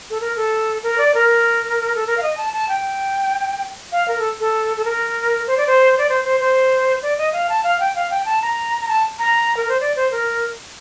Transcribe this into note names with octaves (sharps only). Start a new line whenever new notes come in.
A4
A#4
A4
A#4
D5
A#4
A4
A#4
F5
D#5
A5
A5
G5
F5
A#4
A4
A4
A4
A#4
C5
D5
C5
D5
C5
C5
C5
D5
D#5
F5
A5
F5
G5
F5
G5
A5
A#5
A#5
A5
A#5
A#4
C5
D5
C5
A#4